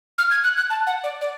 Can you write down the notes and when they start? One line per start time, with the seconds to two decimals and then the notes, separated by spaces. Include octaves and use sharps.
0.18 F6
0.31 G#6
0.44 F#6
0.57 F#6
0.70 A5
0.87 F#5
1.04 D5
1.21 D5